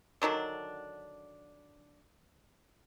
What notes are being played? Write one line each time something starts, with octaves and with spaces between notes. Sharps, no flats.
D3 D#3 F#3 D4